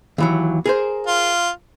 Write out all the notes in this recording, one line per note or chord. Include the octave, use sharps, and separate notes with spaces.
D#2 E3 F#3
G#4 A#4 C5
F4